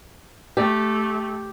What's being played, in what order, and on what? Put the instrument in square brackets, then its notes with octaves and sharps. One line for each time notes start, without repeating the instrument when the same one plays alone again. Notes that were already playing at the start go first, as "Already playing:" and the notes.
[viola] A3 [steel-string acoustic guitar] G4